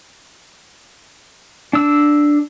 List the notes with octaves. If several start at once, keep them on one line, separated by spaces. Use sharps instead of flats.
D4 E6